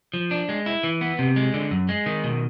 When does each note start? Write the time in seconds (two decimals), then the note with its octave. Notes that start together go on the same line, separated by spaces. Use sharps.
0.14 F3
0.31 D4
0.49 G#3
0.66 E4
0.84 E3
1.01 B3
1.19 C3
1.36 G#3
1.54 D3
1.71 F#2
1.89 G#3
2.06 D#3
2.24 B2